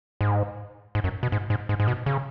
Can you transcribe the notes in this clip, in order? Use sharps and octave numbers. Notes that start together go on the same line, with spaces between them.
G#2
G#2
F#2
B2
G#2
G#2
G#2
G#2
B2
C#3